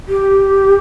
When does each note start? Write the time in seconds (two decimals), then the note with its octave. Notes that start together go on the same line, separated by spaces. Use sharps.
0.08 G4